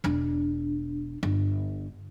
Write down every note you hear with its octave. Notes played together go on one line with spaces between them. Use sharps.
E1 D4
G1